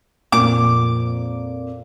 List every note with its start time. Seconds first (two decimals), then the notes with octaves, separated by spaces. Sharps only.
0.32 F2 A#2 D6